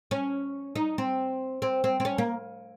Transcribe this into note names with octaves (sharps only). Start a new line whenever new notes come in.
C#4
D#4
C4
C4
C4
C4
C#4
A#3